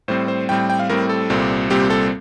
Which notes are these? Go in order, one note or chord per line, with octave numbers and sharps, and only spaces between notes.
A2 G3 C4 C5
C5
A2 G3 C4 G5
G5
G5
F5
A2 G3 C4 A#4
A4
C2 A#2 G3 C4
C2 A#2 G3 C4 G4
A4